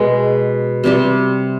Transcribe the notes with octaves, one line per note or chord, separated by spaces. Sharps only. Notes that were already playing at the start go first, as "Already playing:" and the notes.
Already playing: B2 G#3 B3
C3 G3 C4 G4